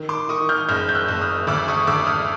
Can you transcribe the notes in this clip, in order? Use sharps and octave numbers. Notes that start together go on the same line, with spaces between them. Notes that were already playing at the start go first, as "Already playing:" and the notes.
Already playing: D#3
C6 D6
D#3 C#6 D#6
F6 G6
F#1 F6 G6
G6
E6 F#6
F#1
D#6 F6
D2 D6 E6
C#6 D#6
D2 D6 E6
D#6 F6